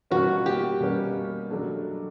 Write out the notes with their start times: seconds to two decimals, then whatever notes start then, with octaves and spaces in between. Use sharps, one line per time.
0.11 B2 G3 A#3 C#4 F#4
0.46 G4
0.80 B2 G3 A#3 C#4
1.51 F#3 A3 D4